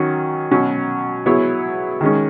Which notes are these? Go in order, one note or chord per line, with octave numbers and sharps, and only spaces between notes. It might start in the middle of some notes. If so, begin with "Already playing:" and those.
Already playing: D#3 F#3 C#4 F#4
B2 F#3 C#4
F#3 B3 E4 G#4 C#5
D#3 G#3 C#4